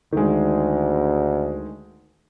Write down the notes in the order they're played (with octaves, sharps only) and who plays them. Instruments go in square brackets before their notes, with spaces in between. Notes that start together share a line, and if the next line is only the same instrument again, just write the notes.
[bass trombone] D2 [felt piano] D#3 G#3